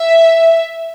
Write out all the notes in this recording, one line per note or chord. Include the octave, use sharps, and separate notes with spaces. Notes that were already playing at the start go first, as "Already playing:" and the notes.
Already playing: E5